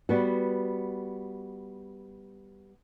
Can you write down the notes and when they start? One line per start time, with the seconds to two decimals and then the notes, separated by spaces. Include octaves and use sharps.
0.09 G3 B3 F#4